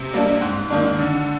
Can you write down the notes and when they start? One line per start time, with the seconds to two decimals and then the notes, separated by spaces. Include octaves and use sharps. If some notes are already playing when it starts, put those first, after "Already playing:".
Already playing: C3
0.13 G3 A#3 D4
0.41 G#2
0.70 D#3 A#3 D4
0.99 D3